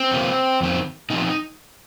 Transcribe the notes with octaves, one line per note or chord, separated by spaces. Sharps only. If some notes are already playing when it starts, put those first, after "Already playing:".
Already playing: C4
F2 C3 F3 A#3
F2 D#3 C4
A#2 F3 C4 D#4